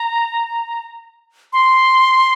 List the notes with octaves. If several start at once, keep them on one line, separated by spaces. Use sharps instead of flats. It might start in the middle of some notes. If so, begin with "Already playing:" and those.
Already playing: A#5
C6